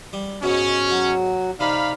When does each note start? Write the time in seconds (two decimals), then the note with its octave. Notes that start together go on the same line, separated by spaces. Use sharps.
0.13 G3
0.43 G#2 B2 C#4
0.90 F#3 F#4
1.60 C3 D#4 D5 F5 B5